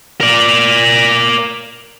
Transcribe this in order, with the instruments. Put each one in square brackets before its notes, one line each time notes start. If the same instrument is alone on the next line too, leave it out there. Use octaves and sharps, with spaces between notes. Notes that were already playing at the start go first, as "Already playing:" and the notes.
[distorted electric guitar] A#4 D5